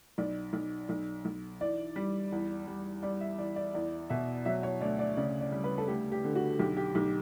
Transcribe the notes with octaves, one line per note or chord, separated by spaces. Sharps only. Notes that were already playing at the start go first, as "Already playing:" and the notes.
B1 D5
B1
B1
B1
E3 D5
G3
E2
G3
G3 D5
E5
E3 D5
D5
E2 D5
B2 E5
F#3 E5
C#5
D2 D5
D5
C#3 D5
D5
G3
B4
A4
D2 G4
G4
D3
F#4
B1 G4
G4
B1 G4